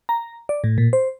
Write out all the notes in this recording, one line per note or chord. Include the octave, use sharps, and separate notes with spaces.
A#5
D5
A2
A#2
C5